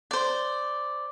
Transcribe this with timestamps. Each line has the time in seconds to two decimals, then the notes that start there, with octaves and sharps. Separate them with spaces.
0.11 C5 D5